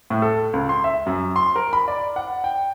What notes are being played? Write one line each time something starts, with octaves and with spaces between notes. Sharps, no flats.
A2
A4
C#2
C6
E5
F#2
C6
A#4
B5
D5
F#5
G5